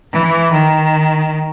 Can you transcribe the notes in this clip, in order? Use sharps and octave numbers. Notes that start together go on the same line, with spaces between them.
E3
D#3